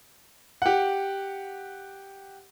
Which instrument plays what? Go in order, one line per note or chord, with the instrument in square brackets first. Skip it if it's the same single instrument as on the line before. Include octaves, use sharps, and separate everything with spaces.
[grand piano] G4 F#5